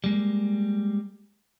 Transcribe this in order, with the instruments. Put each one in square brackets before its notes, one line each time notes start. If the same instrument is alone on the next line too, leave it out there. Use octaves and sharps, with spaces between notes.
[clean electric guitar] G3 G#3 A#3